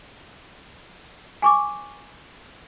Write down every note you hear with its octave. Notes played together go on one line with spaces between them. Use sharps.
G#5 C#6 D6